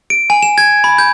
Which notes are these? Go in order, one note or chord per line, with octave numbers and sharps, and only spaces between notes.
D7
G#5
E7
G#6
B5
G6